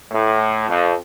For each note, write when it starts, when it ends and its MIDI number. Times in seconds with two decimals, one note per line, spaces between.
0.10 0.65 45
0.69 0.92 41